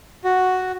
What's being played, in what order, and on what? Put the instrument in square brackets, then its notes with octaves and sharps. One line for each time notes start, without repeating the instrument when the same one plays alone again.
[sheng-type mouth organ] F#4